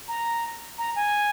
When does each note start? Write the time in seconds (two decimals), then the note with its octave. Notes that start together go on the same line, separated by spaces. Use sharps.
0.08 A#5
0.78 A#5
0.96 G#5